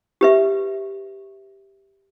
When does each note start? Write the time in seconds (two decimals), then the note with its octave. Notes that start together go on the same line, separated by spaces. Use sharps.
0.21 G4 B4 E5